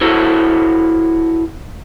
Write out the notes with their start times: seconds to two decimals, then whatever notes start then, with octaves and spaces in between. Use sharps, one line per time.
0.01 E4 F#4 A4 C5 C#5